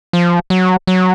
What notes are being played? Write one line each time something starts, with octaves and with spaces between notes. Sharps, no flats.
F3
F#3
F#3